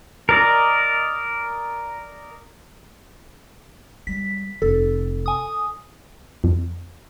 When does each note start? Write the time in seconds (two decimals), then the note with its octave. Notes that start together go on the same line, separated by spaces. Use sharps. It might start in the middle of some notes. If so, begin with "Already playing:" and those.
0.29 A#4 D5 D#5
4.07 G3 B6
4.62 F1 A4
5.26 G#5 D#6
6.44 F2